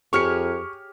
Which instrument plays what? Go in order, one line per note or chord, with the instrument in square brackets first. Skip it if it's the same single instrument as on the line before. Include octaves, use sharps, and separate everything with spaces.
[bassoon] F2 [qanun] G4 G#4 C#5 [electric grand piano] C#6 F6 C#7